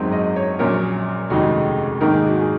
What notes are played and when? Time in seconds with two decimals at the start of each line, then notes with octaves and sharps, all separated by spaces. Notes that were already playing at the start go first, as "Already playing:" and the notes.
Already playing: G#1 F#2 D#3 G#3 C4
0.12 D#5
0.36 C#5
0.59 A#1 A#2 F#3 C#4 A#4
1.30 F1 D#2 C#3 G#3 D#4 F#4
2.00 G#1 G#2 D#3 A#3 D#4 A#4
2.14 G#4
2.27 F#4
2.40 G#4